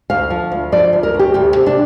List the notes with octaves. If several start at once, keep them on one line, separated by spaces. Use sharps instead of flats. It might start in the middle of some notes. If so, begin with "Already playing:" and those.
D2 F5
F3
D2
F3 D5
D2
A#4
D2
G4
D2 G4
C3
D4